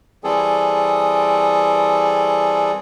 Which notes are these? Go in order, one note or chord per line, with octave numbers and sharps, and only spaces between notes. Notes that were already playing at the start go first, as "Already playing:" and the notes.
E3 G3 C4 G#4 A4